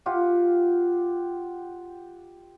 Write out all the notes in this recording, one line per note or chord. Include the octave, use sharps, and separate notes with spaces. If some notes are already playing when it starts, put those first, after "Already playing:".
F4 G4 F#5